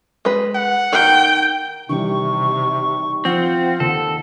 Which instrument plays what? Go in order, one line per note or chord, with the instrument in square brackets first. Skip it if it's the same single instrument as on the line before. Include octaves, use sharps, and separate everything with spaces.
[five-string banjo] G#3 B4
[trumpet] F#5
[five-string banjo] D#3 [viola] G5
[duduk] C3 [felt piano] D#3 E3 G3 [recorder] C#6
[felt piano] F3 [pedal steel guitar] C4 [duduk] F4 [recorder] F#5
[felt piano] D#2 [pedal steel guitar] A4